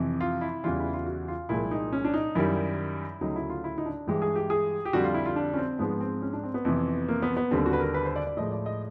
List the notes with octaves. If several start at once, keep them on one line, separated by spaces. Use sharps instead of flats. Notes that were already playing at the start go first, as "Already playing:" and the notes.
Already playing: F2 C3 E3
F4
E4
E2 C#3 E3 G3 F4
E4
F4
F#4
F4
C2 A#2 F3 G#3 E4
D#4
C#4
D4
D#4
F#2 D#3 G3 E4
D2 C#3 F#3 D#4
E4
F4
E4
D#4
D4
G2 E3 G#3 G4
G#4
G4
G#4
G4
F2 D3 G3 F#4
F4
E4
F4
D4
C#4
C4
G#2 F3 G#3 B3
C4
C#4
D4
C4
B3
F2 C3 E3
A#3
B3
B3
D#2 D3 G3 C4
F#4
B4
A#4
B4
C5
D5
D5
A2 F3 G#3 D#5
D5
D#5